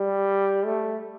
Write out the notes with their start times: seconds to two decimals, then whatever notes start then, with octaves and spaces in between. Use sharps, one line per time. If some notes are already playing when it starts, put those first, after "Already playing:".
Already playing: G3
0.65 A3